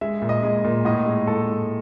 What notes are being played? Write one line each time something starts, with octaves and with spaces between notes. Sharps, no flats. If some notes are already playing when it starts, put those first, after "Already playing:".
G#3 E5
A#2
D#5
G#3
A#2
A2 D#5
G#3
A2 A4
A2